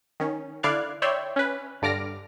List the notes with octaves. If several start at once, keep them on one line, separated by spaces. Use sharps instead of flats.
D#3 C#4
D3 E4 D5 F5 F#6 G#6
C#5 D5 E5 G5 B5 C6
C#4 B4
G2 D3 D5 D6 F6 A#6